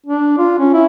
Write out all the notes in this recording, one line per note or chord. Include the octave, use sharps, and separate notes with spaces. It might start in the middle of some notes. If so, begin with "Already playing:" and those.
D4
F4
C#4
E4